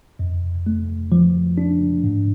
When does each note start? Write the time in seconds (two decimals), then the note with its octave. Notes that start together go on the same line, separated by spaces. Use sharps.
0.19 F2
0.66 A3
1.12 F3
1.58 D4
2.04 G#2